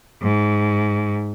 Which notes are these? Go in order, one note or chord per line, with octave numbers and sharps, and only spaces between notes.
G#2